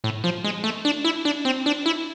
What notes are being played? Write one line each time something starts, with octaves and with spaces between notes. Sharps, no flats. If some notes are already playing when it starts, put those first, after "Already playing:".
A2
F3
G#3
A3
D4
E4
D4
C4
D4
E4